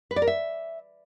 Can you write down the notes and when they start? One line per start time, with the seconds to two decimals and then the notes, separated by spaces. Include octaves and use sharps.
0.11 B4
0.16 D5
0.22 A#4
0.27 E5